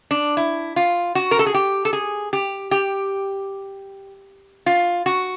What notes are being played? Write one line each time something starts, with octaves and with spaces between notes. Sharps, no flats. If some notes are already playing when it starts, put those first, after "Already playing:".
D4
E4
F4
F#4
A#4
A4
G#4
G4
A4
G#4
G4
G4
F4
F#4